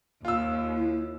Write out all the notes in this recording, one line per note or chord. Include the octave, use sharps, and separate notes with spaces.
D#2 F4 E6
E4